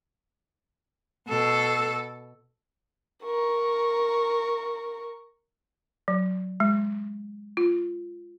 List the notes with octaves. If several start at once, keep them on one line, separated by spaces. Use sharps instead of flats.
B2 A4
A#4 C#6
F#3
G#3
F4